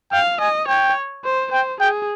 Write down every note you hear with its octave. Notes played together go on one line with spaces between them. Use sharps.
F5 G5
D#5 G#5
C#5 G5
C5
C5 G5
G#4 G5